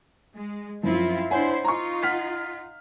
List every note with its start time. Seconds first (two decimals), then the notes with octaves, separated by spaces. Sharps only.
0.35 G#3
0.84 F#2 F3 C4 E4 F4
1.31 D4 E4 C5 C#5 F#5 G#5
1.65 D#4 F4 A#5 C6 C#6
2.03 F#5 F6 B6